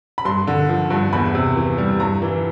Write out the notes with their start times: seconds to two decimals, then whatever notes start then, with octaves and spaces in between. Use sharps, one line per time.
0.18 B5
0.25 G2 C6
0.47 D3
0.69 F3
0.90 G2
1.13 E2 B5
1.35 C3
1.56 E3
1.78 G3
2.00 G2 A#5
2.22 E3